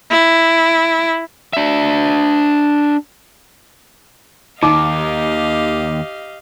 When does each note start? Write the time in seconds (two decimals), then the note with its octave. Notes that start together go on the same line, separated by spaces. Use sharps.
0.11 E4
1.53 D4 E5
4.63 D#2 D#3 D#4 G4 D#5 F5 D6